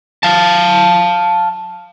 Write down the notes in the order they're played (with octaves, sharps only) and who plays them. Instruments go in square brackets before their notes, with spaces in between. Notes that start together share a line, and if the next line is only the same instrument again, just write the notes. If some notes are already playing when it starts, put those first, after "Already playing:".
[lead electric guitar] F5 A5